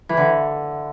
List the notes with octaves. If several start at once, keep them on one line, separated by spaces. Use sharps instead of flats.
E3
D3